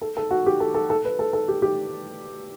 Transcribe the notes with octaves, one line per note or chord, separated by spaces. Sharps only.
A4
A4
F#4
G4
A4
A4
A4
B4
A4
A4
G4
G4